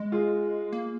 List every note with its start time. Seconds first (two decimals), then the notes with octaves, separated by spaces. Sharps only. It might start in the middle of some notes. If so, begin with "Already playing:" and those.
Already playing: G#3
0.12 F4 G#4
0.73 A#3